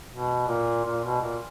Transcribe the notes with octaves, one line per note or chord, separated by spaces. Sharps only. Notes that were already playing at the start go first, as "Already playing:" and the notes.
B2
A#2
A#2
B2
A#2